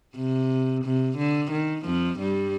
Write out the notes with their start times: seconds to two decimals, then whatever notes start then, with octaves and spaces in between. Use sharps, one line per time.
0.16 C3
0.84 C3
1.17 D3
1.51 D#3
1.85 F2 F3
2.19 G2 G3